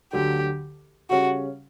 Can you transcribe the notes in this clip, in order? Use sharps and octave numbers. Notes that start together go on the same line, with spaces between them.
D2 D3 F#3 G4
C#3 G3 C#4 F#4